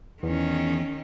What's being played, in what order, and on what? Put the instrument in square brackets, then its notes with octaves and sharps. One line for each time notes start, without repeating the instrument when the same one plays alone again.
[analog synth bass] E2 [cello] D#3 C#4